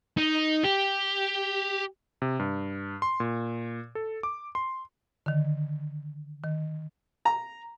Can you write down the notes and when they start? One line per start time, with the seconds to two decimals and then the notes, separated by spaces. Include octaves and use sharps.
0.17 D#4
0.64 G4
2.22 C3
2.39 G2
3.02 C6
3.20 A#2
3.95 A4
4.23 D6
4.55 C6
5.26 D3 D#3
6.44 D#3
7.25 A#5